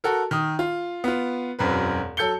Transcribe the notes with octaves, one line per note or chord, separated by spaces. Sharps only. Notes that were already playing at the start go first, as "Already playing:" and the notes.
F#4 A4 A#4
D#3 D#6
F4
B3 F4
E1 F#2 C4 B4
F#3 A4 G6 C#7 G7